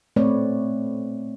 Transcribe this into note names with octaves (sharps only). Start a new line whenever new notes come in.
A#2 A3 C4 B4 C#5 D5